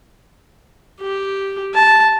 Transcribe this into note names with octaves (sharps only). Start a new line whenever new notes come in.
G4
A5